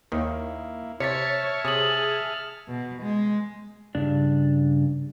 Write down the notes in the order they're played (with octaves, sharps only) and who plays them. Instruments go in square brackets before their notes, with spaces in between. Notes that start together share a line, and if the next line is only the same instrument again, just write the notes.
[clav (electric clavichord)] D#2 D#3 [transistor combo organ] A#3 E4
[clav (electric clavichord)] C3 [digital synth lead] C#5 [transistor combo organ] E5 A5 F6 [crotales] A6 B6 C#7
[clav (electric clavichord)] C3 [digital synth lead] G#4 [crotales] D#6 A6 F#7
[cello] B2
G#3
[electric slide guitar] G2 C#3 D4 D5